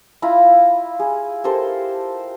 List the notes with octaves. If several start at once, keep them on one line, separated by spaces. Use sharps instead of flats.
E4 F4 A#5 B5
G#4
G4 A4 A#4 C5